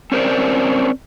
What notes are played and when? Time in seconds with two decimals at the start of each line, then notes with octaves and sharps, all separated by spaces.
0.12 C4 C#4 A#4 C5 D5